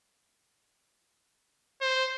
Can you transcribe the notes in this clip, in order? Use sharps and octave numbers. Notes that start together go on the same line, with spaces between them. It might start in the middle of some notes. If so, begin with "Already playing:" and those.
C5